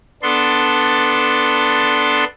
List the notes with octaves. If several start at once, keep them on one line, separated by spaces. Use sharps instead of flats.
B3 D4 A4 C6